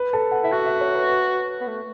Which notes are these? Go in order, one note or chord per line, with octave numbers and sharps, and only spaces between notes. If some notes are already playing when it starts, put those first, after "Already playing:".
Already playing: B4
A4
F#5
E4 E5
F#4 F#5
E5
C#5
B4
B4
B3
A3